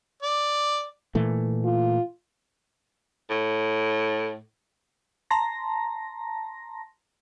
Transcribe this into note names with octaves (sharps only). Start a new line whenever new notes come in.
D5
A#2 E3 A3
F4
A2
A5 A#5 C6 A#6